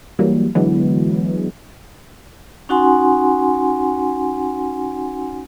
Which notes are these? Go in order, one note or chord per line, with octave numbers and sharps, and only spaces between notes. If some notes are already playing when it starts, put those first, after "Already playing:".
E3 F#3 G3 A#3
D3 E3 F#3 G#3 B3
C#4 D#4 F#4 F#5 G#5 C6